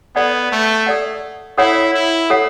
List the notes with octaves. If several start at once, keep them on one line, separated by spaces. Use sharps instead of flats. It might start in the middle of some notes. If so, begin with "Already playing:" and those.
B3 A4 D5 F#5
A3
A4 D5 F#5
E4 A4 C#5 F#5
E4
A4 C#5 F#5